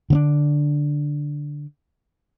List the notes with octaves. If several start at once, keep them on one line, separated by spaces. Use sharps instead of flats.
D3 C4 D4